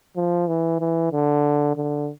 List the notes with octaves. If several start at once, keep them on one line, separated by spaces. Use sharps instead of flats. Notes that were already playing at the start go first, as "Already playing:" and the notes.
F3
E3
E3
D3
D3